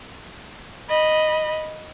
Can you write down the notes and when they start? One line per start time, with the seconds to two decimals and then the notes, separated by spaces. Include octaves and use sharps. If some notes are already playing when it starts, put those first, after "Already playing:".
0.89 D#5 B5